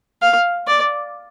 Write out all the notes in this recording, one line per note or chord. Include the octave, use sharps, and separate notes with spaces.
F5
D5